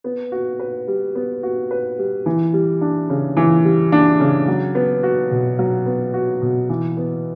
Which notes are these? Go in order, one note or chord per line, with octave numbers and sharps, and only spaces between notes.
B3
F#4
B4
G3
B3
F#4
B4
G3
E3
G3
D4
C#3
E3
G3
D4
C#3
F#3
B3
F#4
B2
F#3
B3
F#4
B2
E3
B3